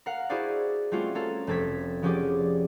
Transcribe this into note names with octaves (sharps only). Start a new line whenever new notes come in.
A#4 F5 F#5
E4 F#4 G#4 C5 D5
G3 A3 C4 C#4 F4 F#4
C#4 F4 A4 A#4
F1 C4 A4 G#6 B6
F3 B3 C#4 G4 G#4 D5